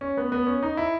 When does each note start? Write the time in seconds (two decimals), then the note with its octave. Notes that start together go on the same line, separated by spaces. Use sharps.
0.01 C#4
0.17 B3
0.32 B3
0.46 C#4
0.63 D#4
0.77 E4